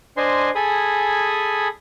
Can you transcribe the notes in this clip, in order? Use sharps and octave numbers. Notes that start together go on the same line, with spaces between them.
D4 C5 D#5 G#5 C6
G#4 A4 G#5 B5 D#6